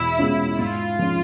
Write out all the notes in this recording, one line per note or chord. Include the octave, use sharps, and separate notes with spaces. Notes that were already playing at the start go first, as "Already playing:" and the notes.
Already playing: E2 B2 G#3 E4
B2 G#3 C#4 F4
G#2 F4
F3 G#3 C#4